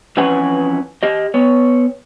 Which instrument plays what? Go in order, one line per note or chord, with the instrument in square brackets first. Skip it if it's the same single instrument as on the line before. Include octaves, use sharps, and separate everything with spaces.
[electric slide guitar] F2 E3 C#4 B4 F#5 G#5
G4 D#5
B3 C#5